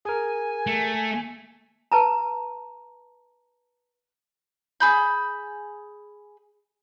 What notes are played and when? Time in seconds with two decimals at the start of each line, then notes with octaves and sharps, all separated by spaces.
0.05 G#4 A#4 G#5
0.67 A3
1.92 B4 A5 A#5
4.80 G#4 B5 G6